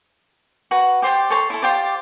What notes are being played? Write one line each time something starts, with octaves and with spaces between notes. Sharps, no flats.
F#4 B4
G4 C5 D5 G5
A4 C#5 A5 C6
E4 A4
F4 G4 C5 D5